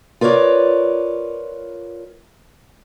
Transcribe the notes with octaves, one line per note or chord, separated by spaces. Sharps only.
F4 A#4 B4 C#5 D5